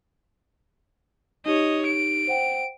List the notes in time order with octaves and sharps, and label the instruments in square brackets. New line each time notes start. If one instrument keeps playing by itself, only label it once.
[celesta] D#4 G4 [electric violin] C#5 D#5
[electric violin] D7
[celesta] C5 F#5 G5